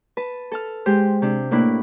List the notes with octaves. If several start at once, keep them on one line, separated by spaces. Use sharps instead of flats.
B4 A5
A4 A5 F6
G#3 G4 C5
C3 D4
A2 A#3 D4 E4 B5 F#6